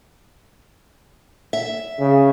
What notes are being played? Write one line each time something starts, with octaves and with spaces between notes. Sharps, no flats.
E5
C#3